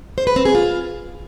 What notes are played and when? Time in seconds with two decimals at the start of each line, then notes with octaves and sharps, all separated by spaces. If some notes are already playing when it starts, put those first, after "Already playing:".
0.18 C5
0.27 B4
0.36 C4
0.45 G#4
0.55 F4